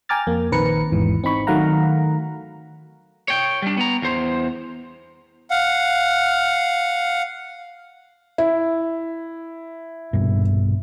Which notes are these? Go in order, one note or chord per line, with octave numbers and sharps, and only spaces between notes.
G5 G#5 A#5 D6 F6 A6
F2 A#3
A#1 D#3 C4 B4 A#5 C#7
G#1 E2 G#2 E3
C4 D#4 B5 C#6
D#3 F#3 A3 F5 F#5 A#5
C#5 G5
G3 D4
B3 A#5
E2 C5
F5 F#5
E4
A#1 G2 B2